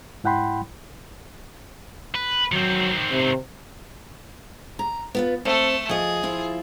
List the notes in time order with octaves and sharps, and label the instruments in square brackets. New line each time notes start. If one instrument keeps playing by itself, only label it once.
[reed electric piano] G#2 E4 F#5 G5 B5 C6
[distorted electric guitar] B4
[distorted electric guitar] D#3 C4 [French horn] F#3
[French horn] C3
[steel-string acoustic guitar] A#5
B3 F4 B4
[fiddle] A3 A4 [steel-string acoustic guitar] C4
[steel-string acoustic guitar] F3 D#5 [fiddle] G#4
[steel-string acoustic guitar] F3 E4 F4